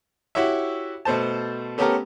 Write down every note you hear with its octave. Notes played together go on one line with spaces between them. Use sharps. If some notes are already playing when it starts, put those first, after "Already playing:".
E4 F#4 G4 C#5 E5
B2 A3 C5 A5
A3 B3 C#4 G4 A4 A#4